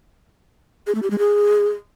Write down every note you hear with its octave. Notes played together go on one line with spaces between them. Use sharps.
G#4
A3
G4
G#3
G#4